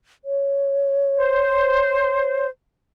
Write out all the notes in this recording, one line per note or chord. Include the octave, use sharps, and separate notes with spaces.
C#5
C5